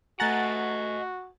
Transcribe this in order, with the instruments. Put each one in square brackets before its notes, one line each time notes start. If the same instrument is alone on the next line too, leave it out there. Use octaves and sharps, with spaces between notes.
[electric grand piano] A3 G#5 [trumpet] F#4 [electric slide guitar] D#5 F#5 [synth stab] A#5 F#6 A6